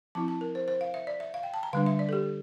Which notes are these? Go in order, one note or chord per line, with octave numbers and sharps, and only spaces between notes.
F3 C4 E4 A5
A5
A#4
C5
C5
F5
E5
D5
E5
F5
G5
A5
A#5
D3 G3 D4 F5
E5
D5
A4
G4